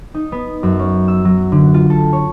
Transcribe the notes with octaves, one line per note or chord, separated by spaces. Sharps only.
D#4
B3
F#2
C#4
E6
F#3
D3
F4
A4
C#5